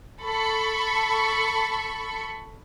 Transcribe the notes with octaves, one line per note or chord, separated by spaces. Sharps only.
A4 B5 C#6